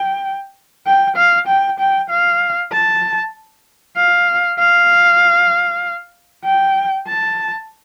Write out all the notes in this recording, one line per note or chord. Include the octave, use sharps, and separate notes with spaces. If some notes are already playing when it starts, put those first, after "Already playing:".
Already playing: G5
G5
F5
G5
G5
F5
A5
F5
F5
G5
A5